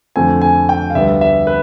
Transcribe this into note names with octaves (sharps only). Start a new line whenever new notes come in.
F2 D3 F3 A3 C4 G#5
G#5
G5
F5
D2 D3 G3 B3 E5
E5
B4